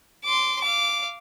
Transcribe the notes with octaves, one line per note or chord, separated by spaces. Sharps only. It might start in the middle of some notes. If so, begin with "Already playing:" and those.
C6 D6
F5 D6